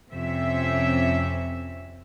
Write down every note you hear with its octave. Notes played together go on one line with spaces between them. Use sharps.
F2 C3 C4 C#4 E5